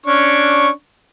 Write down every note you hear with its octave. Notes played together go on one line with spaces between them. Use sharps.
C#4 D4 C#6